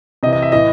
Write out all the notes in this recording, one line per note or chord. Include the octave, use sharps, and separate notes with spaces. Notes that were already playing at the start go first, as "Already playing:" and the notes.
C3 E3 D#5
D#5
E5
A2 E3 D#5